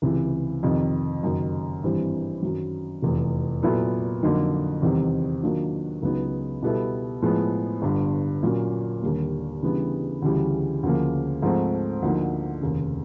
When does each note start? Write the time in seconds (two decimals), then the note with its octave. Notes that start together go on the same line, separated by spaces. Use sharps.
0.02 C#2 C3 E3
0.63 F2 C3 D#3
1.23 F#1 F#2 D#3
1.83 G#1 G2 E3 G3 C4
2.43 F#2 D#3 F#3
3.02 F1 E2 C3
3.62 A#2 F#3 B3 E4 A4
4.23 F2 D3 F#3 A#3 D#4
4.82 E2 C3 D#3 G3 C4
5.43 D#3 F#3 A#3 D4 F4
6.03 C#2 C#3 F#3 B3 D#4
6.62 B2 G3 B3 E4 A4
7.22 A2 F3 G#3 B3
7.82 G1 G2 D3
8.43 A#2 F#3 A#3 C#4
9.02 D#2 D3 G3 A#3
9.63 C#3 E3 G3 B3 D4
10.22 D2 C#3 E3 G3
10.83 D2 C#3 F3 A#3
11.42 G#2 F3 A3 C4
12.02 D2 D3 F3 A#3 D#4
12.62 F1 D#2 C#3